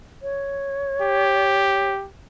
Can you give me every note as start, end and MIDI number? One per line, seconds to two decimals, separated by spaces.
0.22 1.90 73
1.01 2.06 67